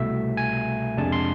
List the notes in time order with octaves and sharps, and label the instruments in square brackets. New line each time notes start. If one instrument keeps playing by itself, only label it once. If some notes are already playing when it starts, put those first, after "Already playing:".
Already playing: [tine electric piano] C2 B2 A3 E5
G#5
F2 C3 G#3 D4 A5
C6